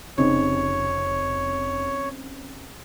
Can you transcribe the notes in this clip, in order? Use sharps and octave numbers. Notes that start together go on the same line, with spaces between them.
F1 C#3 C4 D#4 C#5